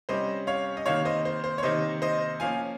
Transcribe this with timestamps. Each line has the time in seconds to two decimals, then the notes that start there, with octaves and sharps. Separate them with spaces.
0.09 C3 G3 C#4 C5 D#5
0.47 C#5 F5
0.77 D#5
0.86 C3 D#3 A#3 C#5 F5
1.05 C5 D#5
1.25 C5
1.44 C5
1.58 C#5
1.63 C3 D#3 A#3 C5 D#5
2.02 C5 D#5
2.40 F3 A#3 C#4 F5 G#5